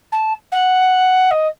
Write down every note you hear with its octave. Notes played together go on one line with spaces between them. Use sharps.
A5
F#5
D#5